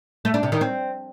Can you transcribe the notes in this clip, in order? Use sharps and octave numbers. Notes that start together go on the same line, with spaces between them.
A3
D4
C3
D#3
C4